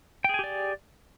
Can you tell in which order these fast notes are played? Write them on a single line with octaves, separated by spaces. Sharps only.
G5 G#4 G#5 G4 D5